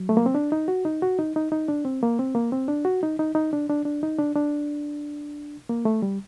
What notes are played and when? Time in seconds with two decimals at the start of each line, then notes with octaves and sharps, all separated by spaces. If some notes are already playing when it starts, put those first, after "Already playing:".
Already playing: F#3
0.09 A3
0.17 A#3
0.26 C4
0.35 D4
0.52 D#4
0.68 F#4
0.85 D#4
1.02 F#4
1.19 D#4
1.36 D#4
1.52 D#4
1.68 D4
1.85 C4
2.02 A#3
2.19 C4
2.35 A#3
2.52 C4
2.68 D4
2.85 F#4
3.03 D#4
3.19 D#4
3.35 D#4
3.53 D4
3.70 D4
3.85 D4
4.03 D#4
4.19 D4
4.35 D4
5.69 A#3
5.85 A3
6.02 G3